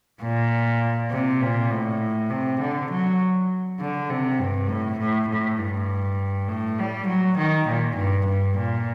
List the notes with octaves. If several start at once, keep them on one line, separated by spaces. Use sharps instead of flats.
A#2
C3
A#2
A2
C3
D3
F#3
D3
C3
G2
A2
A2
A2
G2
A2
G3
F#3
D#3
A#2
G2
G2
A#2